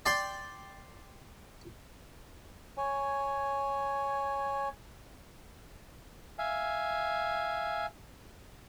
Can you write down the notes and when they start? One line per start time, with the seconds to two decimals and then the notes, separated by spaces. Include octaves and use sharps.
0.06 D5 G5 C6
2.77 C#5 G#5
6.39 E5 F5 G#5